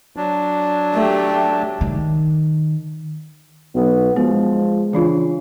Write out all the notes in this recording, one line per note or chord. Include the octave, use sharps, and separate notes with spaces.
F#3 D4
A3 G4
D#3
B1 B3
F3 G#3 B3
C#3 E3 D4 F4